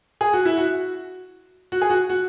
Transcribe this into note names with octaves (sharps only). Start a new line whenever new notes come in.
G#4
F#4
E4
F#4
F#4
G#4
F#4
F#4